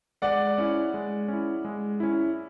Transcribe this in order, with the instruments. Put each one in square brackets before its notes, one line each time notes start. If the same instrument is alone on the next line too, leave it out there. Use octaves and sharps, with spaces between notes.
[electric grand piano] G#3 [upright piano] D5 F#5
[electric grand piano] C#4 E4
G#3
C#4 E4
G#3
C#4 E4